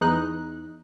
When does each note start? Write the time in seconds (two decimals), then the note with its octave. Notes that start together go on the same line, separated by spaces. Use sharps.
0.01 E2 D#4 F#6